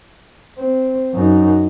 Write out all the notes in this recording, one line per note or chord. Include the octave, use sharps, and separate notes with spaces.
C4
F#2 D#4